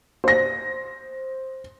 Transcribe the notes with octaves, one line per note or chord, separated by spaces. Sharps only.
C5 A#6